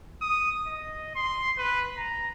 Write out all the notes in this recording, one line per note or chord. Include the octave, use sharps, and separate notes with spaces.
D#6
D#5
C6
B4
A#5